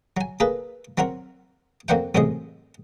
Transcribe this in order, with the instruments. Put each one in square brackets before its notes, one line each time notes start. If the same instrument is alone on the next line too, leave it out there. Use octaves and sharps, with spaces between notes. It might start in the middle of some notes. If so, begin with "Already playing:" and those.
[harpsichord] F#3 G#5
A#3 G#4 A4 B4
F#3 C4 F#4 A#4 C#5
F2 A#3 D4 C5 F#5 G5
A1 F#2 A2 C3 G#3 D#5